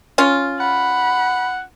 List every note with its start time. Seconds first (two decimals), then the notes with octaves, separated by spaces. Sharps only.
0.18 C#4 F4
0.60 F#5 B5